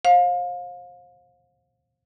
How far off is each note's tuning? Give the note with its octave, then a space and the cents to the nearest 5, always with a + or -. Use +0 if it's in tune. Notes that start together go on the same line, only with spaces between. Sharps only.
C5 +25 F5 +30